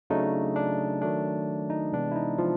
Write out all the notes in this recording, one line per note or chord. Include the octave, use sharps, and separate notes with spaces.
C#3 F#3 A3 D4 D#4
D4
D#3 F#3 A3 D4
D#4
C3 E3 G#3 B3 D4
E4
D#4
F3 F4